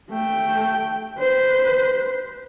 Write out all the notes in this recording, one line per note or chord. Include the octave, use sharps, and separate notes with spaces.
A3 G5
B4 C5